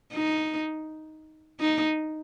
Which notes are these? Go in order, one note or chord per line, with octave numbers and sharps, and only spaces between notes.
D#4
D#4